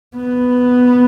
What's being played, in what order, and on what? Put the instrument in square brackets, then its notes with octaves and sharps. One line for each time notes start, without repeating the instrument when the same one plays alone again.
[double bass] B3